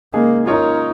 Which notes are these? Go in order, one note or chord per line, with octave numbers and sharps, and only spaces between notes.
C#3 G#3 A#3 D#4 G#4
A#3 C#4 D#4 F4 A#4 C#5